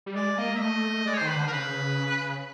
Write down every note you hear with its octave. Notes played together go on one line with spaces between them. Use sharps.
G3
G#3 D5
A#3 D#5
E5
A3 D#5
G#3 D5
C#5
D#3 C5
B4
D3 C5
A#4
C#3 B4